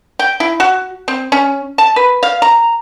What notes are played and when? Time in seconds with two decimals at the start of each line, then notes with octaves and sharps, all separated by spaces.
0.19 G5
0.40 E4
0.60 F#4
1.08 C4
1.32 C#4
1.78 A5
1.96 B4
2.23 F5
2.42 A#5